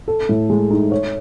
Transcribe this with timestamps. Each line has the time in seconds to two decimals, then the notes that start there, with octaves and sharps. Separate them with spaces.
0.08 A4
0.29 A2
0.50 G#3
0.71 D#4
0.91 C#5